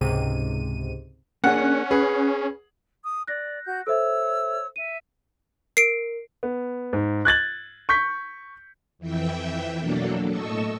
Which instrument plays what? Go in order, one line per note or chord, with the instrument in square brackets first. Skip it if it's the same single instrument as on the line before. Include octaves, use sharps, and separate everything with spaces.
[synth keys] C#2 G#2 C3 D#7
[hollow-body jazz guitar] A#3 D4 G#4 [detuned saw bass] C#4 [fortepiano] F#5
[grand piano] G#4 [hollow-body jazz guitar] B4
[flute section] D#6
[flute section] D5 [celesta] F#6 A#6
[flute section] F#4 G6
[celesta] A4 C5 E5 [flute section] C#5 E6
[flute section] E5 [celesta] D#7
[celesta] A#4 [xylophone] C7 D7
[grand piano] B3
G#2
F#6 G#6 A6 F#7
C#6 G6 B6
[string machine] F2 E3 E5 G5
B2 F#3 A#3 D4 A4
A2 A4 D#5 C#6 E6